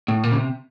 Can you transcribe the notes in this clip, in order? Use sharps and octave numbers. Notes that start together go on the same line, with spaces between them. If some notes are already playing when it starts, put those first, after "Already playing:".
A2
A#2
C#3
C3